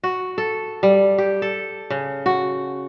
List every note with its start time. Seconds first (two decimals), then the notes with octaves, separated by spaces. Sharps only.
0.04 F#4
0.38 A4
0.83 G3
1.18 G4
1.42 A4
1.90 C#3
2.26 F#4